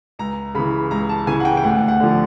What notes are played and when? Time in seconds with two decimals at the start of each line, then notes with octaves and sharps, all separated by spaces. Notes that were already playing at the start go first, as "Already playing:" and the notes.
0.19 C#2 A#5
0.54 C#3 E3 B5
0.91 C#2 A#5
1.09 A5
1.27 C#3 E3 G#5
1.40 F#5
1.45 G5
1.57 G5
1.64 D2 F#5
1.88 F#5
2.00 D3 F3